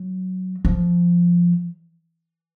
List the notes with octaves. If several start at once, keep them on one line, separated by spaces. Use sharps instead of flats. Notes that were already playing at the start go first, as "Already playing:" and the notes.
Already playing: F#3
F3